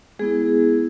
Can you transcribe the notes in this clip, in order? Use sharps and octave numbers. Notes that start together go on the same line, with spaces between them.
G#3 B3 E4 G#4